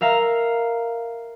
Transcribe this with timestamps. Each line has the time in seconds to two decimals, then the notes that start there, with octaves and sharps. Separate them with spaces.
0.01 A#4 E5 F5 A#5